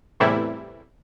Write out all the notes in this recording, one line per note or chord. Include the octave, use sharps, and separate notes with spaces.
E2 A2 C3 E3 G3 E4